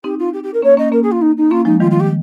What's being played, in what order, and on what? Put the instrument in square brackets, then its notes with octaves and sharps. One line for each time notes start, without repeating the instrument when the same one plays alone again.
[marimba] C4 D#4 [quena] G4
[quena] F4
G4
G4
A#4
[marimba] A#3 C#4 [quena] C#5
[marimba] A#3 C#4 [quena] D#5
[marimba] A#3 C#4 [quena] A#4
[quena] G#4
F4
D#4
D#4
[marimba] A#3 C#4 [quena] F4
[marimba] F3 G#3 [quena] D#4
[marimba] D#3 G3 [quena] F4
[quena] F4
G4